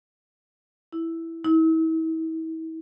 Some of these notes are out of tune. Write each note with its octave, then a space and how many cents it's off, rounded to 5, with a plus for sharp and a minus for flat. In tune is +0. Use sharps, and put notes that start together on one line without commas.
E4 +0
E4 -40